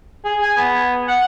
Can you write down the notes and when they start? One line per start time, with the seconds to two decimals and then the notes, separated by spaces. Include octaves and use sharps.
0.25 G#4
0.42 G#5
0.57 B3
1.08 F#5